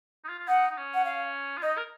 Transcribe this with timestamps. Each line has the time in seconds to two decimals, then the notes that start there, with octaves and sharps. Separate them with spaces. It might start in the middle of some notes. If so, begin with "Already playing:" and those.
0.24 D#4
0.29 F4
0.39 F4
0.48 D#4 F#5
0.71 D#4
0.77 C#4
0.94 F#5
1.05 F5
1.58 F4
1.63 D#4 D#5
1.77 A#4